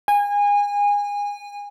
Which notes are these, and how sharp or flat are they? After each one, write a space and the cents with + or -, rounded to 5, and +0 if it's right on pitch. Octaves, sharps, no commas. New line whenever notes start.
G#5 -25